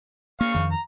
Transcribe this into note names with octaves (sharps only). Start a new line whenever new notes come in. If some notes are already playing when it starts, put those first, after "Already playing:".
A#3 F5 C#6
F2 D#3
A#5